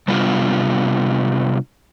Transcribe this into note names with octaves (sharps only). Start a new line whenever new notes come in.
C3 G3 B3 D4 F4